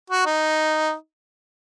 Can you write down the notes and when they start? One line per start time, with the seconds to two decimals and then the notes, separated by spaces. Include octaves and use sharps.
0.10 F#4
0.26 D#4